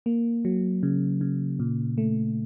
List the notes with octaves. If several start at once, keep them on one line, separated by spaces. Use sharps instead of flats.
A#3
F#3
C#3
C#3
A#2
A3